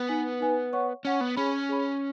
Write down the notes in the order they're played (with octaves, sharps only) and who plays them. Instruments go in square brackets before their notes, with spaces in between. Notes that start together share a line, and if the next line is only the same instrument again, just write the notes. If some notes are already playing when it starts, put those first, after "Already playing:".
Already playing: [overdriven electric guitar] B3
[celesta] D#4 B4 G#5
D#4 B4 G#5
C#5 F#5 C#6
[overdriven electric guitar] C#4 [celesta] C#5 F#5 C#6
[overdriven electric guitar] B3
[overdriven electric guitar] C#4 [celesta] G#4 C#5 B5
[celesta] G#4 C#5 B5